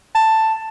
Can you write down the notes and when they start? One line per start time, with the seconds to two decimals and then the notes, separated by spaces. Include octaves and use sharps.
0.15 A5